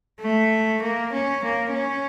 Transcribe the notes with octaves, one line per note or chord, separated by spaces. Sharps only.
A3
A#3
C#4
A#3
C#4